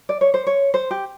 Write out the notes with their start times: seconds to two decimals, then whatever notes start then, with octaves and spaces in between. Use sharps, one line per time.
0.09 D5
0.21 C#5
0.34 C5
0.47 C#5
0.74 C5
0.91 G4